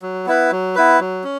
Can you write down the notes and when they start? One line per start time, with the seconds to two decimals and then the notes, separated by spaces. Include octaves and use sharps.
0.02 F#3
0.26 B3 E4 B4
0.51 F#3
0.76 B3 E4 B4
1.00 F#3
1.24 C#4